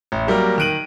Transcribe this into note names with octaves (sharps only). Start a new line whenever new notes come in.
A1
F#3 G3 A#3 A#4
D#3 F#6 D7 D#7 F#7